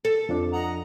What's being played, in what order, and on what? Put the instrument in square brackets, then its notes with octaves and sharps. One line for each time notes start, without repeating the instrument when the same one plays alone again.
[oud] A4
[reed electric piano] F2 F3 D4
[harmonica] D#5 F#5 A#5